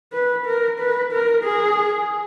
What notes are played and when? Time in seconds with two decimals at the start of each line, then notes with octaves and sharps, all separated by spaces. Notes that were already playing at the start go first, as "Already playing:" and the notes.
0.13 B4
0.46 A#4
0.80 B4
1.12 A#4
1.44 G#4